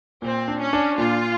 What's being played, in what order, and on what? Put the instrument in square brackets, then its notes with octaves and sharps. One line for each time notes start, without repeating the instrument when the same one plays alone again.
[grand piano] A#2 [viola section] C4
[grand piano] D4
[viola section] C#4
[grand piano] D4
[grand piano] A#2 [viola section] F4